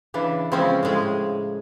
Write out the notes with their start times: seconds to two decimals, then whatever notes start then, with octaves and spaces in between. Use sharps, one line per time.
0.14 C#3 E3 D4
0.52 C#3 F3 G#3 C4 C#4
0.83 A2 C#3 G#3 G#4